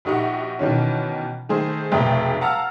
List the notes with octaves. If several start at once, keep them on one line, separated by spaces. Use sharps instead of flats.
A#1 D#4 F#4 G4 F#5
B2 D#3 E3 C#4
D#3 A3 G#4 C5
F1 B1 A3 G#4 E5 G5
F5 F#5 A5 A#5 E6 F6